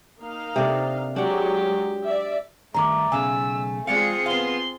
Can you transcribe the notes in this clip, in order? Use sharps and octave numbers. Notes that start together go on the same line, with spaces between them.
A#3 D#4 F5
C3 D4 A4
F#3 G#3 D4 G4 F#5
D5 E5
G2 D#3 A3 A#5 D6
B1 C#3 F5 G#5 E6
G#3 C4 F4 G#4 D5 F5 C#7
B3 F5 C6